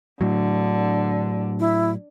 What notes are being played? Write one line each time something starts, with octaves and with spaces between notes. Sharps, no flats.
A2 D3 F#3
E4